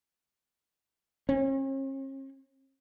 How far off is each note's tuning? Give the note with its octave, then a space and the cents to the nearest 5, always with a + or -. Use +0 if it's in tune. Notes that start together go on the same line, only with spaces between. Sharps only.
C#4 -45